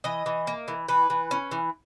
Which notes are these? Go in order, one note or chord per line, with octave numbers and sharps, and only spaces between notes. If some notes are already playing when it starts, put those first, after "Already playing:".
E3 D#5
E3
A#3
E3
E3 B4
E3
C#4
E3